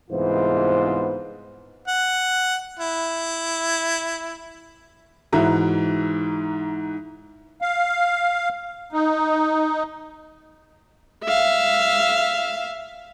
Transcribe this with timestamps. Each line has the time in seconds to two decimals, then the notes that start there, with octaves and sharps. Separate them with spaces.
0.11 C2 G#2 E3 B3 F4 C5
1.88 F#5
2.79 E4
5.33 G#2 E3 F#4 E5 A#5
7.62 F5
8.92 D#4
11.24 E5 F5